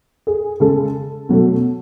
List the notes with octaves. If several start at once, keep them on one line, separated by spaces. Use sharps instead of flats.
G#4
C#3 G#3 A4
B2 F#3 A3